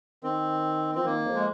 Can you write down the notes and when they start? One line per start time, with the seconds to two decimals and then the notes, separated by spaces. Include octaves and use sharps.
0.23 D#3 C4
0.95 F3 C4
1.05 D#3 A#3
1.26 F2
1.35 G#3